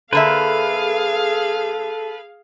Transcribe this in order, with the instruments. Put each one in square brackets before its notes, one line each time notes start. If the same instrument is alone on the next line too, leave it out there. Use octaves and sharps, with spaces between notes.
[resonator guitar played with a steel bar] D3 A#3 E5 [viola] G#4 F5 [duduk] A4 [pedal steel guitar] B4